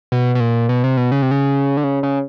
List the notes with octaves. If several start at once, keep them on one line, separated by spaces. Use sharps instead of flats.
B2
B2
A#2
B2
C3
B2
C#3
C3
C#3
D3
C#3
C#3